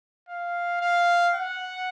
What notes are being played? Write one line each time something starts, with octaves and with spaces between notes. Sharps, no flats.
F5
F5
F#5